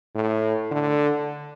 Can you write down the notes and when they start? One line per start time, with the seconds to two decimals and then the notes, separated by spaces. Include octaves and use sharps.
0.15 A2
0.71 D3